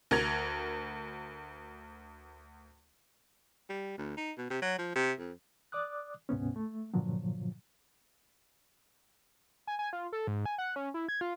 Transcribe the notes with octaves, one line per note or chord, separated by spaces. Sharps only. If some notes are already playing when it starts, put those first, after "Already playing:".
D2 A#4 G#6 F7
G3
D2
D#4
B2
C3
F#3
F3
C3
F2
D5 D6 D#6 F#6
D2 G#2 C3 B3 C#4
A3
G2 A#2 D3 F3 F#3
G#5
G#5
F4
A4
G#2
G#5
F#5
C#4
E4
G#6
F4